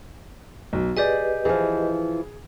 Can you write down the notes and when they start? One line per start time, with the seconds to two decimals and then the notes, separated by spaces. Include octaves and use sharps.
0.73 B1
0.97 G4 G#4 B4 D5 D#5
1.45 E3 F3 G#4